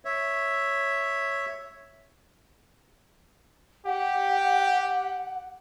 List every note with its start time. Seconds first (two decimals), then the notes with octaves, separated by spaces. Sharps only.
0.05 C#5 E5
3.86 G4 F#5